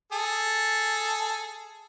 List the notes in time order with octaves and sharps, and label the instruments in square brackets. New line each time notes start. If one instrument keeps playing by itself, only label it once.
[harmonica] G#4 A4